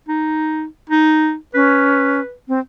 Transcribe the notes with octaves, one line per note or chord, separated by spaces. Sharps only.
D#4
D#4
C#4 B4
C4